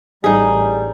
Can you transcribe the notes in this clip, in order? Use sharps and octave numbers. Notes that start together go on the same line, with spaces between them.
A1 G3 D#4 G#4